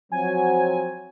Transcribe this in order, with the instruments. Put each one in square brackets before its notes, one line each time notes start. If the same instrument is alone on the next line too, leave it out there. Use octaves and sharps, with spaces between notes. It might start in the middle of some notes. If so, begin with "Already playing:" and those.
[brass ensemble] F3 F#3 C4 [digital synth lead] G#5